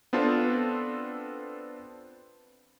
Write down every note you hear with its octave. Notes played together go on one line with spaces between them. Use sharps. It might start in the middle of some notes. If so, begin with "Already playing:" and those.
B3 C4 D4 F4 A4